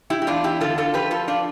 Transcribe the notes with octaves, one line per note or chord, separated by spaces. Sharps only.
E4 G4
G4
E2 D4 F4
E4 G4
D3 F4 A4
F4 A4
F3 G4 B4
F4 A4
D4 F4